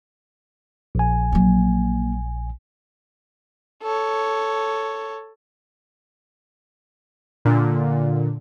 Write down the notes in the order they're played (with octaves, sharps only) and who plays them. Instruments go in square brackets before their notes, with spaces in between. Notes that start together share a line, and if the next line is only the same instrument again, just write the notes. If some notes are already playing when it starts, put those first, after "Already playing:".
[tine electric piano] A#1 G#5
[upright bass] F#3 A#3
[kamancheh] A4 C#5
[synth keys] A#2 D3